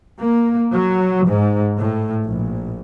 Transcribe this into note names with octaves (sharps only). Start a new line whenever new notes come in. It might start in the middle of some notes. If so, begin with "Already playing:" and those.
A#3
F#3
G#2
A2
A#1